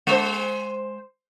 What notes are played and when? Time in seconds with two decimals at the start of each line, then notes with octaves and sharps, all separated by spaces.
0.07 G#3 C5